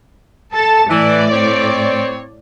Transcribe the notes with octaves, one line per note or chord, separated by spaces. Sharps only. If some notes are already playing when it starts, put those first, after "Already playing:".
A4 A5
A2 E3 D5
C4 C#5